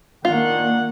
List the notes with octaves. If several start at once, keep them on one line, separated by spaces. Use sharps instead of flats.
D#3 A#3 D4 F4 F#5